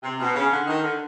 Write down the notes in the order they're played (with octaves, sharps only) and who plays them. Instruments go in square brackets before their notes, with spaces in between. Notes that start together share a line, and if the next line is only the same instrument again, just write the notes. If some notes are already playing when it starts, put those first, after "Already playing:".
[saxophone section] C3
B2
C#3
D3
D#3
D3